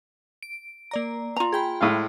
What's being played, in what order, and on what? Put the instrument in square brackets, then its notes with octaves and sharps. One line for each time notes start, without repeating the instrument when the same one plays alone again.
[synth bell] D7
A#3 D5 A#5
[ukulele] F4 A#5
[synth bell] G#4 G5 B5
[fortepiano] A2 G#3 F5